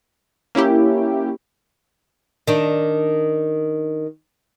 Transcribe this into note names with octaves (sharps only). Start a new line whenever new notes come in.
A#3 C#4 E4 G4
D#3 D4